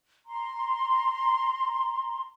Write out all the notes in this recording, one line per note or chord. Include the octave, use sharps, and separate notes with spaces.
A#5 C6